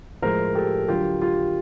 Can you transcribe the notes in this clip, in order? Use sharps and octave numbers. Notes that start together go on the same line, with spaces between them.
A2 F3 G#3 A#4 C5
G4 A4
D3 F#3 F4 G4
F4 G4